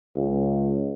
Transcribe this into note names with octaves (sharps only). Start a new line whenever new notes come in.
C#2